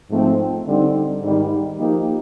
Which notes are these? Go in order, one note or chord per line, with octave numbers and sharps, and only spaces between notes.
G#2 F3 A3 C4
D3 G3 C4 D#4
G#2 D#3 G3
F3 A#3 D#4 G4